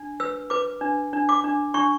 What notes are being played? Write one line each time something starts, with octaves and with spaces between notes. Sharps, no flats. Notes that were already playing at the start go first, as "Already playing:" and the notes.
Already playing: D4
B4 E6
B4 D6
D4
D4
D6
D4
D4 C#6